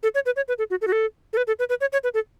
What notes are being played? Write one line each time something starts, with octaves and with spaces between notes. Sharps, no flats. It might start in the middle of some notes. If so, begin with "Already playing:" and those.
A4
C#5
B4
C#5
B4
A4
F#4
A4
F#4
A4
A4
B4
A4
B4
B4
C#5
C#5
B4
A4